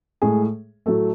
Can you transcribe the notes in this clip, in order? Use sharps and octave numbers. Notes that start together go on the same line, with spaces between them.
A2 G#3 G#4
A2 F#3 A3 A4